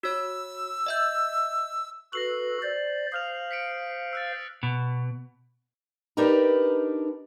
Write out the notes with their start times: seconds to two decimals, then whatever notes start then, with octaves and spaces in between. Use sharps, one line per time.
0.03 F#4 C#5 E6
0.86 D#5 E5 G6
2.13 F#4 A4 B4 A#6 C7 F#7
2.62 C5 D5
3.12 C5 F5 D#6 F6 F7
3.51 B6 C#7 D7
4.13 E6 F#6 A6
4.63 B2
6.17 D4 D#4 G4 A#4 B4